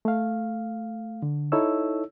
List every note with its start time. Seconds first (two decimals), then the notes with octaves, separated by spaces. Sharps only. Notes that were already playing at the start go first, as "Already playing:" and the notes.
0.05 A3 F5
1.22 D3
1.52 D#4 E4 A4 C#5 E6